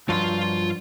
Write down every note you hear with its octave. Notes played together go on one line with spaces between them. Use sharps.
G2 F3 F#3 F4 C6